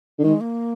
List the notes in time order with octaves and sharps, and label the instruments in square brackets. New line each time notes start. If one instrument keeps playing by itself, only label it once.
[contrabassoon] D3
[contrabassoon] D#3 [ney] G#3
[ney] A#3